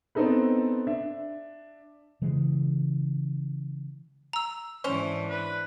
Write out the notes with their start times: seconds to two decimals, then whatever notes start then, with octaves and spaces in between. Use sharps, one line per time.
0.15 B3 C4 D4 D#4 A4 B4
0.87 D4 E5
2.22 C#3 E3 G#3
4.33 A#5 E6
4.84 G#2 E3 C#4 D4 C5
5.29 D4 B4